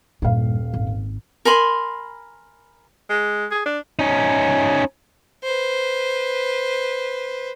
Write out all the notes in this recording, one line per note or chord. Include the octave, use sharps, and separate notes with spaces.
D#1 G2 A#2 F5
G#1
A#4 G#5 B5 C6
G#3
G#4
D4
C#4 D#4
B4 C5